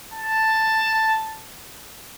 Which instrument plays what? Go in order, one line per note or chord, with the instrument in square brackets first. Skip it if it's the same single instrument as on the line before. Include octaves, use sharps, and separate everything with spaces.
[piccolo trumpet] A5